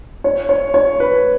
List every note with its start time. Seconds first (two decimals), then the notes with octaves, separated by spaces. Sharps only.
0.24 C#5
0.49 C#5
0.74 C#5
1.00 B4